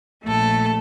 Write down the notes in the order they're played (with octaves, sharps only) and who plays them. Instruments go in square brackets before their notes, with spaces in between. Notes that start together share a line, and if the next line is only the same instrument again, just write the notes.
[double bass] A#1 [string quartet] A3 A4